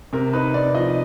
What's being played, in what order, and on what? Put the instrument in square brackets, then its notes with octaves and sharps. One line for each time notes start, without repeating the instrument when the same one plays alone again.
[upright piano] C3 A#4
D#4 B4
C3 D5
F3 D#5